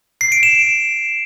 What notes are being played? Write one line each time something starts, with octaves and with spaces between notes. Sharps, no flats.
C7
D7
E7